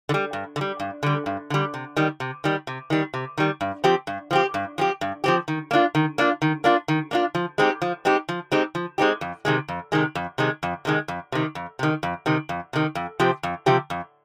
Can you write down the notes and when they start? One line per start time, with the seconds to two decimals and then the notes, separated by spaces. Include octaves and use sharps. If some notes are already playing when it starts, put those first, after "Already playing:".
0.09 D3
0.14 G3
0.33 G2
0.56 D3
0.61 G3
0.80 G2
1.03 D3 G3
1.26 G2
1.50 D3 G3
1.74 C3
1.96 D#3 G3
2.20 C3
2.44 D#3 G3
2.67 C3
2.90 D#3 G3
3.14 C3
3.38 D#3 G3
3.61 G2
3.84 F3 C4 G4
4.07 G2
4.31 F3 C4 G4
4.54 G2
4.78 F3 C4 G4
5.01 G2
5.24 F3 C4 G4
5.48 D#3
5.71 A#3 D4 F4
5.95 D#3
6.18 A#3 D4 F4
6.42 D#3
6.64 A#3 D4 F4
6.88 D#3
7.11 A#3 D4 F4
7.35 F3
7.58 G#3 C4 D#4 G4
7.82 F3
8.05 G#3 C4 D#4 G4
8.29 F3
8.52 G#3 C4 D#4 G4
8.75 F3
8.98 G#3 C4 D#4 G4
9.21 F2
9.45 C3 D#3 G#3
9.68 F2
9.92 C3 D#3 G#3
10.15 F2
10.38 C3 D#3 G#3
10.63 F2
10.85 C3 D#3 G#3
11.08 F2
11.32 C3 D#3
11.55 F2
11.79 C3 D#3
12.03 F2
12.26 C3 D#3
12.49 F2
12.73 C3 D#3
12.95 F2
13.20 C3 F3 C4 G4
13.43 F2
13.66 C3 F3 C4 G4
13.90 F2